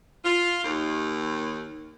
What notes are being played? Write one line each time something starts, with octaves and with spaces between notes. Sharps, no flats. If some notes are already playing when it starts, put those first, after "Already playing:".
F4
D#2